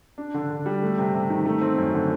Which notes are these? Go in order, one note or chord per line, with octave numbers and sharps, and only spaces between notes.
D4
D3
D3
G3
A3
C3
C3
D#3
A3
C4
F#2
D3